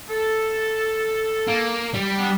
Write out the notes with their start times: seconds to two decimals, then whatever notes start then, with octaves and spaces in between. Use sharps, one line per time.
0.10 A4
1.48 A#3
1.94 G3
2.19 B3 D4